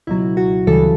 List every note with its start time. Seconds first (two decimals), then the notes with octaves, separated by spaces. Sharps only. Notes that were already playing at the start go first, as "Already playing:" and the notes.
0.07 C#2 B2 F#3 E4
0.37 F#4
0.67 D2 C#3 E3 G3 A4